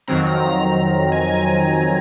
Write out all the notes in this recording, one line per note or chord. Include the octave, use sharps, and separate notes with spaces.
F2 D#3 F#3 C4 A#5
A#5
G#5